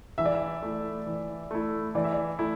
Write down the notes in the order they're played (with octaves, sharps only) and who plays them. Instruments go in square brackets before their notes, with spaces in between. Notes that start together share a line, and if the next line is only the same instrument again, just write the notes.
[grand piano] E3 [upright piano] E5
[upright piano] D5
E5
[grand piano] A3 E4
E3
A3 E4
[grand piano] E3 [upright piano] D5
[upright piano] E5
D5
[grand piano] A3 E4